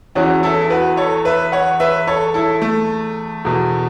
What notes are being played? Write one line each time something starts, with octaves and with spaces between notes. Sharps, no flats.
E2 E3 C#4 F#4
E4 A4
F#4 B4
A4 C#5
B4 E5
C#5 F#5
B4 E5
A4 C#5
E4 A4
A3
E2 B2